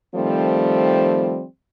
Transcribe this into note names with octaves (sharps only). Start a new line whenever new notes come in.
D#3 F3 G3 A3 C4